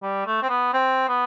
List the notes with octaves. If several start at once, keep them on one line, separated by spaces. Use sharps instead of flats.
G3
A3
C4
B3
C4
B3